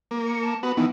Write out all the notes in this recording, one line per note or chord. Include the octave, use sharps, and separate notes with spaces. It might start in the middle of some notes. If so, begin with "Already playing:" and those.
A#3
C#7
A5
B3 F#4 B5
D#3 E3 B3